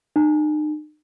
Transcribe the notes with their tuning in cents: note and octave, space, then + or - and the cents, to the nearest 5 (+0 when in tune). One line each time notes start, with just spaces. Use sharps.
D#4 -40